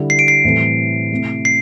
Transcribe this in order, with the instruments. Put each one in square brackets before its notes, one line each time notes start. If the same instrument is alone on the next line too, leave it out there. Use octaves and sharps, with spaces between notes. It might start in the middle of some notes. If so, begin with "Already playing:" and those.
Already playing: [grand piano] D3 G3 E4
[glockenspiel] C7
D7
C7
[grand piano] A2 E3 G3 C4 A4
C3 A3 E4
[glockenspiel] C7